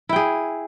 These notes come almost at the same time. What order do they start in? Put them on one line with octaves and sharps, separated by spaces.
E4 G5 G#4